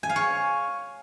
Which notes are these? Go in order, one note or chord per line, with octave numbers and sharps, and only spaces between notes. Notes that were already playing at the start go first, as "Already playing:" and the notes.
G#5
F5
C#5